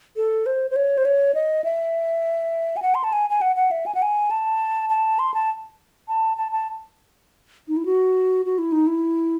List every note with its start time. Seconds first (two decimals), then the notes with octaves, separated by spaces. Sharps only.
0.16 A4
0.46 C5
0.71 C5
0.76 C#5
0.98 C5
1.05 C#5
1.35 D#5
1.64 E5
2.77 G#5
2.82 F#5
2.95 C6
3.04 A5
3.13 G#5
3.30 G#5
3.41 F#5
3.56 F#5
3.71 E5
3.86 G#5
3.95 F#5
4.02 G#5
4.31 A5
4.90 A5
5.19 C6
5.34 A5
6.08 A5
6.37 A5
6.52 A5
7.68 D#4
7.77 E4
7.85 F#4
8.46 F#4
8.58 E4
8.72 D#4
8.87 E4